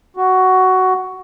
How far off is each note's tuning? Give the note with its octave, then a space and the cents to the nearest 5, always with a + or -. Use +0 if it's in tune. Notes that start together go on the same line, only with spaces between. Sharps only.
F#4 +10